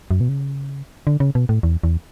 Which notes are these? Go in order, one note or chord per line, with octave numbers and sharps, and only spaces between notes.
F#2
B2
C#3
D3
C#3
B2
A2
E2
E2